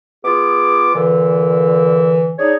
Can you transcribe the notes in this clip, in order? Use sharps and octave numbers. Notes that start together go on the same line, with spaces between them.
B3 F4 G#4 D6
A#2 D3 E3
D4 D#4 G#4 C#5